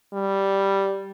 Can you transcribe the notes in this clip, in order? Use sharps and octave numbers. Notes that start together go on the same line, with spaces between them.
G3